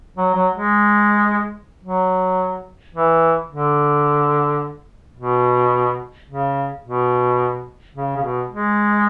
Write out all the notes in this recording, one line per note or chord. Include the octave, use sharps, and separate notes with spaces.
F#3
F#3
G#3
F#3
E3
D3
B2
C#3
B2
C#3
C#3
B2
G#3